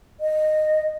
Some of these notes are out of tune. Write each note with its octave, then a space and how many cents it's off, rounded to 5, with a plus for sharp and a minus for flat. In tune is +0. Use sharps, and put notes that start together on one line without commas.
D#5 -15